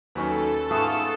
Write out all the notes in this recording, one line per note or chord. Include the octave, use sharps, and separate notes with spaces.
D#2 F#3 C#4 D#4 A4 B4
G#2 A3 B3 F4 G#4 A5 C#6